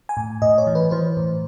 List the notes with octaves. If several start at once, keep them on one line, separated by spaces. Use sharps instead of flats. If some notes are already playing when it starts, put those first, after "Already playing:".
G#5
A2
A2 D#5
C#5
E3
B4
E3 C5
A2